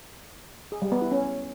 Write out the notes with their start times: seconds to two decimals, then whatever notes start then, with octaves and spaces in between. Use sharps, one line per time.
0.72 G#4
0.82 G3
0.92 B3
1.02 E4
1.12 C#4